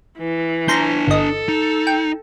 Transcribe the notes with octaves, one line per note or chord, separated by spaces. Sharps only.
E3
D4 G#5 A#5 C6 G6
G1 A4 D#5
D#4
G5